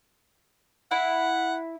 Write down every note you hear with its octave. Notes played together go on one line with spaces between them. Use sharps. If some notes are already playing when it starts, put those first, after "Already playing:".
E4 F#5